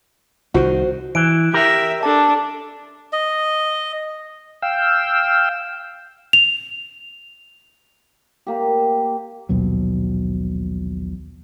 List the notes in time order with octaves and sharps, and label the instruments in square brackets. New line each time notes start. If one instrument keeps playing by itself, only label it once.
[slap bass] C2 D#3 [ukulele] F#4 C5
[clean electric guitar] E3 [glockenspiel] D7
[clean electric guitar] G4 A#4 [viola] E5
[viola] D4 A4 [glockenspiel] A5
[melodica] D#5
[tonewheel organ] F5 G5 E6
[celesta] F7
[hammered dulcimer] A#3 G4
[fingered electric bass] A#1 D#2 B2 F#3